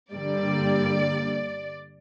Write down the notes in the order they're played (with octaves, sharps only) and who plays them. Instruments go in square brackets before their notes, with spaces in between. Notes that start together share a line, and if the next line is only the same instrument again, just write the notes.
[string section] G2 D3 G3 A#3 D5